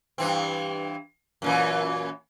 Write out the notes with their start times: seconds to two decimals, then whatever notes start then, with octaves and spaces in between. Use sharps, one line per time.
0.18 G2 E3 C4
1.42 F#2 A#2 E3